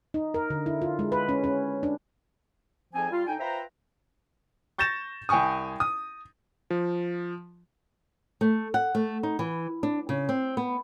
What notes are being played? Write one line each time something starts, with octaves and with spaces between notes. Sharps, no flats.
D#4
A#4
D3
E4
F4
G#3
B4
C#4
C#4
D4
F2 G#2 F3 C4 G#5
G3 F4
D3 D#4 G5 G#5
F4 B4 C5 E5 G5 A#5
C#6 G6 A6 A#6 E7
C2 G5 G#5 C#6 D#6
D#6
F3
A3
F#5
A3
D#4
E3
D4
C#3
C4
B3